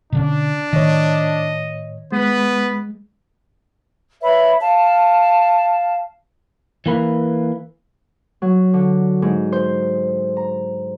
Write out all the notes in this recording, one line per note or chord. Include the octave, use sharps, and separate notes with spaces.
B2 D3 C#4 D4
A2 D#3 C#5 D#5
G#3 B3 B4
B4 C#5 E5 B5
F5 A5
E3 A#3 B4
F#3
D3
G#2
C5
A#5